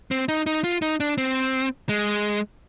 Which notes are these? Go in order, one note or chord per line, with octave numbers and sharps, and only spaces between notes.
C4
D#4
D#4
F4
D#4
D4
C4
G#3